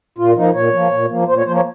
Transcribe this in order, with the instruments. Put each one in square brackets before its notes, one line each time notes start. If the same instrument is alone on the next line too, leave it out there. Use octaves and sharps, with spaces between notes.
[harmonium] A#2 F4
F3 A#3 D#4
A#2 C#5
F3 A#3
A#2
F3 A#3
A#2 C5
C#5
F3 A#3 C5
C#5